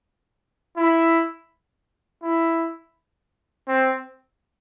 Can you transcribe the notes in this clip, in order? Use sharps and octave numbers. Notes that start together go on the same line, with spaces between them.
E4
E4
C4